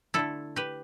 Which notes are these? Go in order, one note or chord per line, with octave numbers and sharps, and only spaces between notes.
D3 A3 E4 A4
G4 B4